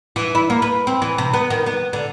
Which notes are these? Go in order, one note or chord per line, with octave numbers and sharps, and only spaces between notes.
E3
E4
A#3
B4
C4
E3
C3
B3
D#3
B3
D3